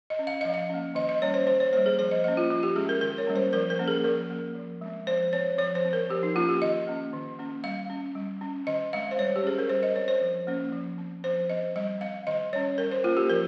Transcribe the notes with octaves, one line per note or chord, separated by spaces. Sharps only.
D#5
C#4
F5
F3 D#5
F5
A#3 C#4
D#3 D#5
D#5
G3 A#3 C#4 C#5
C5
D#3 C5
C#5
G3 A#3 C5
G#4
F3 C5
D#5
A#3 C#4 D#5
F4
F3 F4
G4
G#3 C#4 G#4
A#4
D#3 A#4
C#5
G3 A#3 C#4
C5
F3 A#4
A#4
A#3 C#4
G#4
F3 A#4
A#3 C#4
F3
G#3 C4
F3 C5
C4 C#5
F3 C#5
C5
C4
A#4
F3 G4
D#4
A#3 C#4 F4
G4
D#3 D#5
A#3 C#4
D#3
A#3 C#4
G3 F5
C#4
G3
C#4
D#3 D#5
G#3 C4 F5
C5
G3 C#5
G4
C#4 G#4
A#4
G3 C5
D#5
C4 C#5
C5
F3
A#3 C#4
F3
C4
F3 C5
C4 D#5
G3 D#5
C4 F5
D#3 D#5
G3 C#4 C#5
G3 A#4
C5
A#3 C#4 F4
G4
F3 A#4